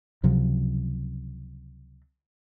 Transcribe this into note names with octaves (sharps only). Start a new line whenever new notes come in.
C#2 C3 F3 F#3